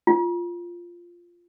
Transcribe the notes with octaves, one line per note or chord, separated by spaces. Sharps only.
F4